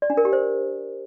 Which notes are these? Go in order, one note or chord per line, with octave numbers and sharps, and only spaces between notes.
D5
D4
A#4
G4
C5